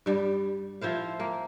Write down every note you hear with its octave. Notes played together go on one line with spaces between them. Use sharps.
G2 G3
F3 E4 C5 F5
A#3